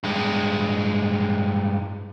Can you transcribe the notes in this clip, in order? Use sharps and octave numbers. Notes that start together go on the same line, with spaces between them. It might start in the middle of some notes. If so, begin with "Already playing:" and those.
G2 G#3